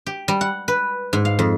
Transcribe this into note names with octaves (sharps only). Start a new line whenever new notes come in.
G4
G3
F#5
B4
G#2
F5
F2